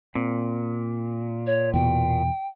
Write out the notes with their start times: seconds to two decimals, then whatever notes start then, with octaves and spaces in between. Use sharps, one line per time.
0.15 A#2 C4
1.47 C#5
1.74 E2 B2 G5